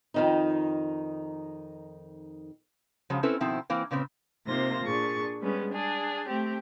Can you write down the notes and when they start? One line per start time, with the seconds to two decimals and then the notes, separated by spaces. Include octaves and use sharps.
0.14 F2 D#3 D#4
3.10 C#3 F3 F#3 G#3
3.23 C4 C#4 E4 A4 B4 C5
3.40 B2 D#3 F3 C4 E4
3.70 E3 A#3 C4
3.91 A#2 C#3 B3 C4
4.46 C3 A#3 D#4 F4 C5 A#6
4.83 A#2 D4 G#4 C#6 A6
5.39 G3 G#3 B3 C#4
5.72 D4 G#4
6.27 A3 C4 G4